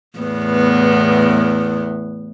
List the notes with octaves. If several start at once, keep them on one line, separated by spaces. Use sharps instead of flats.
E2 A2 B3